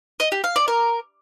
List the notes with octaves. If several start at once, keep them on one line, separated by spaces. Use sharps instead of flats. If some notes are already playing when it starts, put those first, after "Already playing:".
D#5
G4
F5
D5
A#4